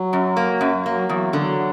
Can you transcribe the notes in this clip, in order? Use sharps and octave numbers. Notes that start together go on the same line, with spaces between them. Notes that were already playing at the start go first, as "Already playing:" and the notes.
Already playing: F#3
F#2
A#3
F#2
F#3 A#3
E2 F#3
D3 F#3